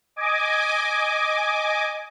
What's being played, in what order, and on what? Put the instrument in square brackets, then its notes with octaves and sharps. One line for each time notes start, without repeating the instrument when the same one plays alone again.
[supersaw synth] D#5 G#5 D6